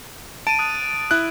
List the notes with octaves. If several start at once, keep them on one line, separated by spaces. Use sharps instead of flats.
A5 D7 D#7
D#6 F#6 A6
E4 F#6